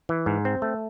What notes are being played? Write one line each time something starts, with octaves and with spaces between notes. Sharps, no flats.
E3
G#2
C4
A3